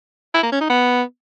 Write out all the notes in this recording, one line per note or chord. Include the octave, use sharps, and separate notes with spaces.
E4
A#3
C#4
D#4
B3